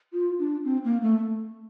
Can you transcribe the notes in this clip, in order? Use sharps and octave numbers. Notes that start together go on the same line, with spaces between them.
F4
D4
C4
A#3
A3